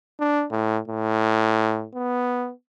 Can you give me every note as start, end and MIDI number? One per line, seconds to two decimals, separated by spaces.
0.20 0.45 62
0.51 0.79 45
0.88 1.86 45
1.94 2.51 59